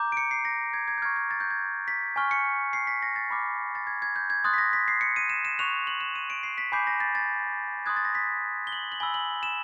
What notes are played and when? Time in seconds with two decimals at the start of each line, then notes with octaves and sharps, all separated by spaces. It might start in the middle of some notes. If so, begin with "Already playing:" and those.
Already playing: A#5 D6 G6
0.12 D7
0.17 C#7
0.31 C7
0.45 A#6
0.73 G#6
0.88 G#6
0.98 G6
1.02 C#6 F6 G#6
1.16 G#6
1.31 A6
1.40 G6
1.51 G#6
1.88 B6
2.16 G#5 C#6 F6
2.31 C#7
2.73 C7
2.87 B6
3.02 A#6
3.16 A6
3.30 B5 D6 F6
3.75 A6
3.87 G#6
4.02 G#6
4.16 G6
4.30 G#6
4.44 C6 D#6 F#6 A6
4.54 B6
4.58 A#6
4.73 B6
4.88 C7
5.01 C#7
5.16 D#7
5.30 E7
5.45 E7
5.59 C#6 F#6 F7
5.87 F#7
6.01 E7
6.16 D#7
6.30 D7
6.43 C7
6.58 B6
6.72 G#5 B5 D6 G6 C7
6.87 A#6
7.00 A6
7.15 A6
7.86 C6 D#6 F#6 G#6
7.96 A6
8.05 A#6
8.15 B6
8.67 G7
8.72 F#7
8.92 F#7
9.00 G#5 B5 E6 G7
9.14 F#7
9.43 E7